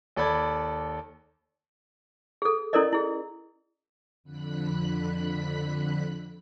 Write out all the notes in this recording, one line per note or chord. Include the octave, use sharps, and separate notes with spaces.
D#2 A4 D5 B5 G#6
G#4 A4
C#4 E4 A4 A#4 D5 D#5
E4 G#4
F2 D3 B5 F#6 B6